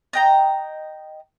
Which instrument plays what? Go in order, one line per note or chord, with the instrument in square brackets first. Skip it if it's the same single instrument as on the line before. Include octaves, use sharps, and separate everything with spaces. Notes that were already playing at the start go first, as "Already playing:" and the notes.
[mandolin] D#5 G5 A#5